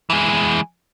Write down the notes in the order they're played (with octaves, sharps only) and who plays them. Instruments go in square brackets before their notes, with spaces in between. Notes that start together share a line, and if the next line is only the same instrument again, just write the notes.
[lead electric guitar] E3 G#3